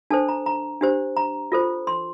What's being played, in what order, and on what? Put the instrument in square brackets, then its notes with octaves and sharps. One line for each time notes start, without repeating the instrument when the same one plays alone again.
[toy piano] D4 A4 C5 A5
A#5
A#5
D4 G4 C5
A#5
F4 A4 C5
C6